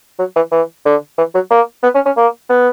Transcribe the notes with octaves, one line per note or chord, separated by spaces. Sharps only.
F#3
E3
E3
D3
E3
F#3
A#3
B3
C#4
C#4
A#3
B3